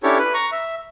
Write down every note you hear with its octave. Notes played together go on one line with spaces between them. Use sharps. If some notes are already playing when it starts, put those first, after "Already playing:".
C#4 D4 E4 G4 A4 C#5
B4
A#5 C#6
E5